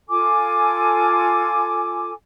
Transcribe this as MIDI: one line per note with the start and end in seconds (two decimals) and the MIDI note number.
0.09 2.11 65
0.09 2.11 69
0.09 2.11 80
0.09 2.11 86